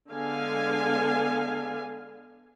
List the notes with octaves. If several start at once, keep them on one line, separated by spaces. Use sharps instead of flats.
D3 G#3 B3 F5 G#5